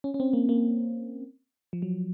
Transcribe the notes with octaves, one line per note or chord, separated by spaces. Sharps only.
C#4
C#4
C4
A#3
A#3
F3
F#3